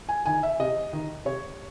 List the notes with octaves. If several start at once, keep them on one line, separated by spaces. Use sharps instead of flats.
G#5
D#3 G#5
E5
C3 D#5
D#3
C3 C#5